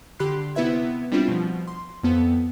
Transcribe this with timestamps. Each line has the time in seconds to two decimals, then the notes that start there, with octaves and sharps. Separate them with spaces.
0.19 D3 G4 B5 C6 F#6 C7
0.55 C3 B3 E4 B4 E5 G#6
1.12 G3 C4 D4 E4 F4
1.28 B2 F3
1.68 C6
2.03 F2 B3 A4